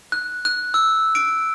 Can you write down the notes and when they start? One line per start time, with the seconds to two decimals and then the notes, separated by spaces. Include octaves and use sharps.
0.12 F#6
0.45 F#6
0.74 E6
1.15 D7